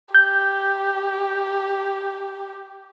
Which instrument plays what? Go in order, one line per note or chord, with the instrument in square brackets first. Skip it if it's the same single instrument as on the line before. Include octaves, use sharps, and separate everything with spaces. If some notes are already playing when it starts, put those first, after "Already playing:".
[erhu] G4 [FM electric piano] G6